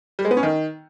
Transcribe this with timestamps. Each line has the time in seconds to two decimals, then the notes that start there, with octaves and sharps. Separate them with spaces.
0.19 G3
0.25 G#3
0.31 B3
0.37 C#4
0.43 D#3